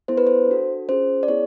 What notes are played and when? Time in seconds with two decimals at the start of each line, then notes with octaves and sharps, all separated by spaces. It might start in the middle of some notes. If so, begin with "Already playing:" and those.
0.08 B3 E4 A4 C5
0.17 B4
0.27 C5
0.49 D4 F#4 A4
0.89 C#4 F4 G#4 C5
1.23 D5
1.28 B3 E4 G#4 C#5